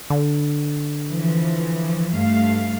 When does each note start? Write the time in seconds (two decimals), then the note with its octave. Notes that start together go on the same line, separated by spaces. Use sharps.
0.10 D3
1.10 E3 F3
2.16 G2 A3 F5